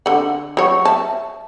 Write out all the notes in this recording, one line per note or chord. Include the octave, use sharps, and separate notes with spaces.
D3 F#5
F#3 C#5
E5 A5